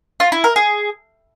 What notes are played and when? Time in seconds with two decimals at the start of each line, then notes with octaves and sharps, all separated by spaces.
0.20 F4
0.32 E4
0.44 A#4
0.56 G#4